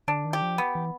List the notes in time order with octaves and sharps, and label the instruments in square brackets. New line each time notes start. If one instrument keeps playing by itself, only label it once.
[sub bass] D3 [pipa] D4
[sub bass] D#3
[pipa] G4
[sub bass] F3
[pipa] B3
[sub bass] E3